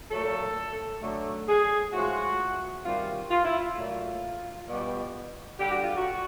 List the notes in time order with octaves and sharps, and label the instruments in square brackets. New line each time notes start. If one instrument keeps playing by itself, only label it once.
[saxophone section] A#2 F#3 A3 A4
D3 F#3 A3
G#4
A2 F3 G#3 F#4
C3 D#3 G3 F4
F4
E4
F4
A#2 F#3 A3
B2 G3
D3 G3 G4
F#4
F4
F#4